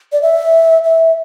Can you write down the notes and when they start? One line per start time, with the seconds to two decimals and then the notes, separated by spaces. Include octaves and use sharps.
0.12 D5
0.22 E5
0.84 E5